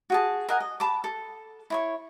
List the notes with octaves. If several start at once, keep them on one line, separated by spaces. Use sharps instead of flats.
F#4 G#4 A5
A#4 D#5 F#5 G#5
D#5
A5 B5 D6
A4
E4 C#5 C#6